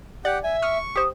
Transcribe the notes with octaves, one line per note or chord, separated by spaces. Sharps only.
G4 D5 F#5
E5 G#5
C#6 D#6 F6
G4 C5 D#6